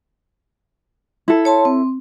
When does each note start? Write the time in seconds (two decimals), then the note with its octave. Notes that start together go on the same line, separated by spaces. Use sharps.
1.28 E4 A4
1.45 C#5 A5 C6
1.65 C4